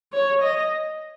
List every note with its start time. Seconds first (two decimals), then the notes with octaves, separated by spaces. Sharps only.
0.13 C#5
0.42 D#5